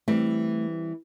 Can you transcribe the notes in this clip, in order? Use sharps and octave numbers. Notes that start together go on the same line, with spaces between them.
E3 G3 A3 C4